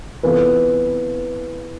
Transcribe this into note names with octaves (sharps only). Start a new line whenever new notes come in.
C3 E3 B3 F4 A4 B4